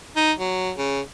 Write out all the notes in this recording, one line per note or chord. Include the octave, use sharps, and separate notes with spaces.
D#4
F#3
C#3